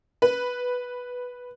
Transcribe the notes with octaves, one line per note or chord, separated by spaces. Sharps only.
B4